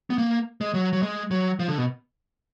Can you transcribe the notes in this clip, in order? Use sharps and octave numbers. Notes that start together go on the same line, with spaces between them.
B3
A#3
G#3
F#3
F#3
G#3
F#3
F3
D3
B2